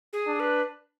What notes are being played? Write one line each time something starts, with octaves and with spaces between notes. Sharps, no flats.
G#4
D4
B4